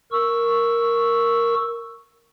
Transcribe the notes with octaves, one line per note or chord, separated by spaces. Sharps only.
A#4 C#6 E6